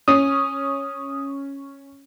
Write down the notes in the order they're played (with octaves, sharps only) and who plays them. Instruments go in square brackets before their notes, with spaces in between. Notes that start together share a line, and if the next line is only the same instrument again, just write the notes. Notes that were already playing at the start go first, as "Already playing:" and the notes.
[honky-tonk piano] C#4 [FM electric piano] D#6